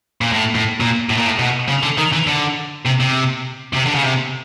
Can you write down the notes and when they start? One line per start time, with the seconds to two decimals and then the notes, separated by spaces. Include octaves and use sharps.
0.21 A#2
0.32 A2
0.55 A2
0.80 A#2
1.09 A2
1.17 A#2
1.25 A2
1.39 B2
1.68 C#3
1.83 D3
1.98 D#3
2.13 E3
2.27 D3
2.86 C3
3.01 C3
3.74 C3
3.87 D3
3.96 C#3
4.04 C3